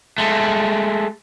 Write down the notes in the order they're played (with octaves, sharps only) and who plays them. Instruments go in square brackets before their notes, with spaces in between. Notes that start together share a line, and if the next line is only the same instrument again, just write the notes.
[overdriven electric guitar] G#3 A3